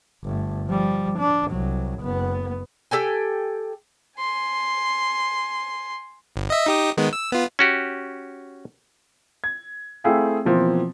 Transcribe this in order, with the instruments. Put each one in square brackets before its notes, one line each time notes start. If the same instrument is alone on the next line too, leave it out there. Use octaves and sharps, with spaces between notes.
[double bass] G1 A3
F3 G3
D4
C2 F#3
F#1 B3
[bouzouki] G4 A4 G5 G#5
[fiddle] G#5 C6
[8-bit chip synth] G1
D#5 E5
D#4 G4 D#6
D#3 G#3 B3
E6
B3 F4
[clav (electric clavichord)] C#4 F#4 G4
[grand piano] G#6
A3 C4 E4 G#4 F5 G5
B2 E3 F3 A#3 C4